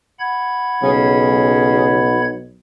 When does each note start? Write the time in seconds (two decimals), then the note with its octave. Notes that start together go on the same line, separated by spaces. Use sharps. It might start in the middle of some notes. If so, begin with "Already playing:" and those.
0.20 F#5 B5 G#6
0.83 B1 C#3